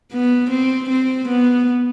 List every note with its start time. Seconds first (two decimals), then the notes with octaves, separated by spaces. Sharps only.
0.13 B3
0.51 C4
0.90 C4
1.28 B3